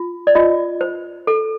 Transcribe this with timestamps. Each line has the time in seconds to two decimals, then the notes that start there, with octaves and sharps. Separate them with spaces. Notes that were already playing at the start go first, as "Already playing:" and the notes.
Already playing: F4
0.27 D5
0.35 F4 D#5
0.81 C5
1.27 A4